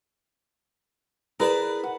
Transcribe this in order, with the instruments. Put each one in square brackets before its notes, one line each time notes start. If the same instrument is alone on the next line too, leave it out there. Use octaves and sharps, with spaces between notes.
[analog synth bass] E4 [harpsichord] G#4 D5 A5 [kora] A#4 [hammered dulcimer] B4
[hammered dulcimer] F#5